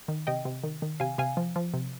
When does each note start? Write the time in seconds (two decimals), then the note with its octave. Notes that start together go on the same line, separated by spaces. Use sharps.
0.08 D#3
0.27 C3 D#5 G5
0.45 C3
0.64 D#3
0.82 D#3
1.00 C3 F5 G#5
1.18 C3 F5 G#5
1.37 F3
1.56 F3
1.74 C3